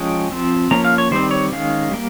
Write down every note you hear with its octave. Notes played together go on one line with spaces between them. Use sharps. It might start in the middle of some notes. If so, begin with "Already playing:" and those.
Already playing: F3 G#3 C#4 G5
F3 C4
F3 A#3 C#4 A#5
F5
C#5
D#3 G3 C4 C5
C#5
D#3 G#3 C#4 F5
G3 A#3